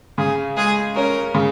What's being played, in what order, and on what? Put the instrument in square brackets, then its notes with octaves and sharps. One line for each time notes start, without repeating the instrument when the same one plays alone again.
[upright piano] C#3 [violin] G#4
[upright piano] G#3 [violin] G#4
[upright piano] C#4 [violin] A#4
[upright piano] C#3